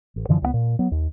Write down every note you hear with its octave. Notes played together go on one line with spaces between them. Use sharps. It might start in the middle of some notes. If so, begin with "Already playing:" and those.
A1
F#2 D3 E3 F3
C#2 E3 B3
A#2
F#3 B3
D#2